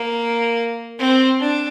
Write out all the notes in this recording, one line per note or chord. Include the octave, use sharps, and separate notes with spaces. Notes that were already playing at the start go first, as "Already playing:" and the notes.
Already playing: A#3
C4
D4